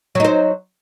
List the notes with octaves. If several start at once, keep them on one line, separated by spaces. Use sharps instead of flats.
F#3 D#4 C5